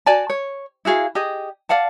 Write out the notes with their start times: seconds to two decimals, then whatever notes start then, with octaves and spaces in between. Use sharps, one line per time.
0.06 F#4 D5 G#5 A5
0.30 C#5
0.85 E4 F#4 G#4 F5
1.15 G4 G#4 D#5
1.69 D5 F5 F#5 A5